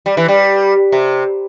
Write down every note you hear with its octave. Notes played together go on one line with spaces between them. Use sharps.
G3
E3
G3
C3